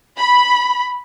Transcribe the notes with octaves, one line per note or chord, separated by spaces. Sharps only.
B5